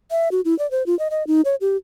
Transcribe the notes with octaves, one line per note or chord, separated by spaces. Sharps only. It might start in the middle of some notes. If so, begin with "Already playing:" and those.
E5
F#4
E4
D5
C5
F4
D#5
D#5
D#4
C#5
G4